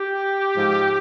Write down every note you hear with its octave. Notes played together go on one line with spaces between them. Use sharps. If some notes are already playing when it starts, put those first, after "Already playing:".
Already playing: G4
G#2 F3